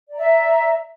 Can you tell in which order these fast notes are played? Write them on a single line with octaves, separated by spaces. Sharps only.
D5 A#5 E5